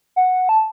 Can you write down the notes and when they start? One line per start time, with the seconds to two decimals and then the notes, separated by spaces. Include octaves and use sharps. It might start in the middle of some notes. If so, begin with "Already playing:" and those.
0.16 F#5
0.49 A5